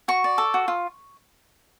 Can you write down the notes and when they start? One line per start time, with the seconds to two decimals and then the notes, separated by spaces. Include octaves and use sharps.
0.08 F#4 C#6
0.24 D5
0.38 A4
0.54 F#4
0.68 F4